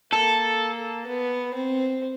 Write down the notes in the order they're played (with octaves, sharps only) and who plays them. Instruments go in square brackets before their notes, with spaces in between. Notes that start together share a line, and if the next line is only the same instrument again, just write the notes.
[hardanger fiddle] A#3 [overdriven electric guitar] A4
[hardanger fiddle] B3
C4